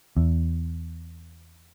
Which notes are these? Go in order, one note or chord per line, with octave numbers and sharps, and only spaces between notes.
E2